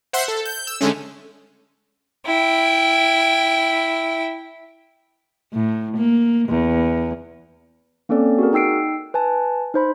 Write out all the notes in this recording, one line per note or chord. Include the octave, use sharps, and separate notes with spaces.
C5 E5 F#5 C6
A4
G6
E6
D3 G#3 A3 C#4
E4 G5
A2
A#3
E2
A#3 C4 C#4 A4 D5
F#4 G#4 A#4
D#4 G5 E6 C7 D7
B4 G#5 A5
D#4 C5 B5